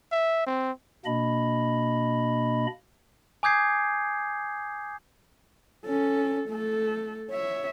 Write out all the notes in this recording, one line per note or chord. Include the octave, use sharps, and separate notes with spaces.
E5
C4
B2 A#3 D4 D#5 B5
G#5 D6 D#6 G6 G#6 C7
C#4 A4
A3 A4
C#5 E5